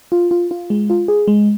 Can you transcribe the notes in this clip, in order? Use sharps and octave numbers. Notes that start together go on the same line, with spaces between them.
F4
F4
F4
G#3
F4
G#4
G#3